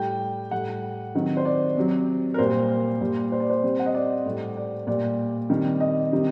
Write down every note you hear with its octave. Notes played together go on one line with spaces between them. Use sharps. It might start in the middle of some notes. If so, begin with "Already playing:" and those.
Already playing: A2 G3 G5
A2 G3 F#5
C3 D#3 F#3
C5
D5
C3 F#3
A#4
A#2 G3 C5
A#2 G3
C5
D5
C5
C3 G3
F#5
D#5
D5
A2 G3
D5
A#2 G3 D5
C3 D#3 G3
D#5
C3 D#3 G3